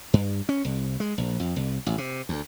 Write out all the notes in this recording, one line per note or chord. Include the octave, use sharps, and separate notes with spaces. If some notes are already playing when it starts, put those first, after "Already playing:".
G2
C#4
C2
G#3
A#1
F2
C2
A1
C3
D2